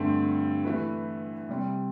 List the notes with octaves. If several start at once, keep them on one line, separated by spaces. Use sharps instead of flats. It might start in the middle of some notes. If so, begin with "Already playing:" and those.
Already playing: G2 D3 A3 C4
E3 A3 E4 B4
C3 G3 C4